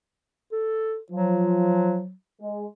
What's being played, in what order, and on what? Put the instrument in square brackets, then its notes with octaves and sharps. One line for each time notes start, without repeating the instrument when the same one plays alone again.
[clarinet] A4
[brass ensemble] F3 [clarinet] F#3
[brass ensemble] G#3